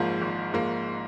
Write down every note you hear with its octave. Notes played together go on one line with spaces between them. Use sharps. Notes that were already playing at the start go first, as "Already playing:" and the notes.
Already playing: G#1 G#2 F3 A#3
G#1
G#2 F3 A#3